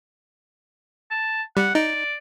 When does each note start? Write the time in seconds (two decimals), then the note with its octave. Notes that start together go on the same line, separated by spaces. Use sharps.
1.11 A5
1.57 G3 F#5
1.75 D#4 D5